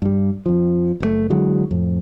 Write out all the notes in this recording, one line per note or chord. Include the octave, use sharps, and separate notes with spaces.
G2 G3
F2 F3
F#1 A#2 A3
D3 E3 F#3 G#3
F2 A2